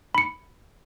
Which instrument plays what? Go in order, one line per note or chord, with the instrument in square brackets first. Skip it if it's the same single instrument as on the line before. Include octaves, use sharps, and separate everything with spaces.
[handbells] B5 C#7